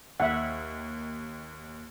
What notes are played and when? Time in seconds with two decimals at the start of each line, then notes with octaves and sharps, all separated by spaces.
0.20 D#2 E5 F#5